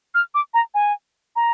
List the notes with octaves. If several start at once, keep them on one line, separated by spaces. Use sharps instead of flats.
F6
D6
A#5
G#5
A#5